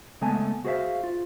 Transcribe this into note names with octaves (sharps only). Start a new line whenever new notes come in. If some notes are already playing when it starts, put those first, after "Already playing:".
C#3 G#3 A3 B3 G#5 A5
F#4 G#4 C5 D5 E5 F5
F4